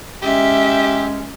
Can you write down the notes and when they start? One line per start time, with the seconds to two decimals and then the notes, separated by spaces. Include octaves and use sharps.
0.22 G#3 C#4 G4 E5